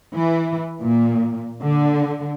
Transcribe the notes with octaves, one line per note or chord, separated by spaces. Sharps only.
E3
A#2
D3